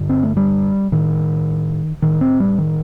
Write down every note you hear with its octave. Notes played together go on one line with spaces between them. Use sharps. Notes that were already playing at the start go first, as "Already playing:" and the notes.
Already playing: G2 D3
C4
A3
G3
A2 D#3
A2 D#3
C4
G3
D#3